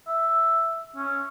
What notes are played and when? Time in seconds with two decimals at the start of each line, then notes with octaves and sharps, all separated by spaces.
0.08 E5
0.96 C#4